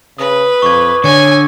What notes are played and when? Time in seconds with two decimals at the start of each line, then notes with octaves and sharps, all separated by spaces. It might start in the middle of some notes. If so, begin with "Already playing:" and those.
0.18 C#3 B4 D#6
0.62 F2 C#6 D6 G#6
1.04 D3 C#5 G#5 G#6 C#7